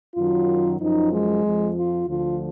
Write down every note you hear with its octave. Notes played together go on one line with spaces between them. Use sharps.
F#2 D#3 F#3 F4
F#2 F3 D#4
G#3
F2 F3
F4
D2 D3 F3 F4